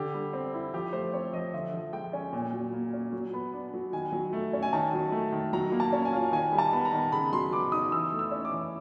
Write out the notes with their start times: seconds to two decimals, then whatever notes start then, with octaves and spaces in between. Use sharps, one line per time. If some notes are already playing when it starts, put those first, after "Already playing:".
Already playing: D3 G4
0.14 G3
0.33 C4
0.54 E4
0.74 F3 G4
0.93 A3 C5
1.13 C4 C#5
1.33 F3 D#5
1.53 D3 E5
1.74 F3
1.93 G#3 G5
2.13 C#4 G#5
2.33 A#2
2.53 F#3
2.73 A#3
2.93 C#4
3.12 F#3
3.33 B3
3.54 D4
3.74 F#3
3.93 D#3 G#5
4.12 F#3
4.33 A3
4.53 C#4
4.63 G#5
4.73 D#3 A5
4.93 F#3
5.12 A3
5.32 D#3
5.53 F#3 A#5
5.72 A#3
5.80 A5
5.93 C#4
6.05 G#5
6.13 F4
6.32 D#3 G#5
6.52 G3
6.58 A5
6.73 B3
6.85 A#5
6.93 D#3
7.12 C#3 B5
7.33 F#3 C6
7.52 B3 D6
7.72 D#4 D#6
7.92 E3 E6
8.12 A3
8.19 E6
8.31 C#4
8.45 D6
8.51 E3